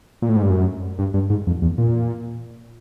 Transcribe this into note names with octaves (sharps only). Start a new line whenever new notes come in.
A#2
A2
G#2
G2
F#2
G2
G2
G#2
F2
E2
A#2